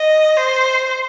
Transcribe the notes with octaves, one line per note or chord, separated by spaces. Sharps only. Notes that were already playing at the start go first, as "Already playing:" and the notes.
Already playing: D#5
C5